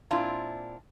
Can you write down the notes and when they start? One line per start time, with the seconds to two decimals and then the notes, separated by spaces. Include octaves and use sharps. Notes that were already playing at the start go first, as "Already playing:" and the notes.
0.11 A#2 C4 D4 E4 F4